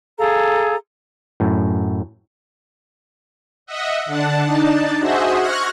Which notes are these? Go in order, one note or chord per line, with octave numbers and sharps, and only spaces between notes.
G#4 A4 F5 A#5
F#2 A2
D#5 E5 F#5
D3 D4 F#5 A5
D4 D#4 D5 A5
F#4 G#4 C5 D#5 E5 F#5
C#6 F6 F#6 G#6 A#6